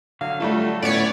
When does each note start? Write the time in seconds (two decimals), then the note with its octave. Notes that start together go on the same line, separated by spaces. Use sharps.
0.21 D3 F#3 F5
0.40 G3 A3 F4 A4
0.82 A2 B3 C#4 C#5 D5